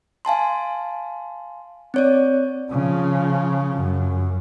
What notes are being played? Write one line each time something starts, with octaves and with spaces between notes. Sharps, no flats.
F5 G#5 A5 C6
C4 C#5 D5
C#3 F3
F#2